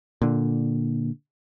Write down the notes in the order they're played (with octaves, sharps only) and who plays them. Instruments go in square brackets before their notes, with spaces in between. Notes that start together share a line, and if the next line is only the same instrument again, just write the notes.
[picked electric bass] A#2 D3